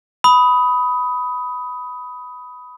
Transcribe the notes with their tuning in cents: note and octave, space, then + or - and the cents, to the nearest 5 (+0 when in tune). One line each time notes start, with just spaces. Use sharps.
B5 +5 D#6 +15